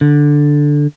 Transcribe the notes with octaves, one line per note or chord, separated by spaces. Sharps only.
D3